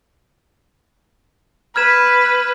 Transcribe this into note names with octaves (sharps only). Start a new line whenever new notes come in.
B4 F6 G#6 E7